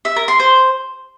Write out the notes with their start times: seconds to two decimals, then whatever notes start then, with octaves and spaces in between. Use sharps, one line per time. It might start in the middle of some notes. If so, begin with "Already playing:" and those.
0.05 E5
0.16 A#4
0.28 C6
0.40 C5